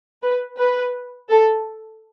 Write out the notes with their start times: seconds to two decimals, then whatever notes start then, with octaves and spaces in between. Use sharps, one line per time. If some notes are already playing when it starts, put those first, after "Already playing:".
0.23 B4
0.58 B4
1.29 A4